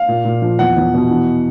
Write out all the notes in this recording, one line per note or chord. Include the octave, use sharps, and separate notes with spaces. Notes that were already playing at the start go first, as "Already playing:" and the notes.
Already playing: F5
A#2
A#2
F3
E2 F#5
E2
B2
E3